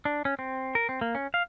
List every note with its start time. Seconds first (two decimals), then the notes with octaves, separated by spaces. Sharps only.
0.05 D4
0.25 C#4
0.39 C4
0.75 A#4
0.89 C4
1.01 A#3
1.15 C#4
1.34 F5